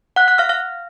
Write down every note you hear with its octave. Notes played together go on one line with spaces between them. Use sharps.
F#5 F#6
F#5 F#6
F5 F6
F5 F6